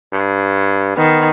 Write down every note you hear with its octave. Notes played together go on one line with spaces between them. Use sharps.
G2
D#3 B3